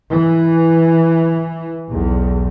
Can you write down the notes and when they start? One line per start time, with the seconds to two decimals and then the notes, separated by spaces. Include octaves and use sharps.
0.11 E3
1.90 B1 E2